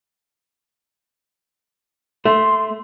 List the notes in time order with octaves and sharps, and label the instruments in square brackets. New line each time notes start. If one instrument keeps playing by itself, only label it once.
[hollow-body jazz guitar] A3 [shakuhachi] C6